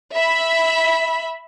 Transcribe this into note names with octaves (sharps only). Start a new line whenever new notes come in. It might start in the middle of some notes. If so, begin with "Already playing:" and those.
E5 B5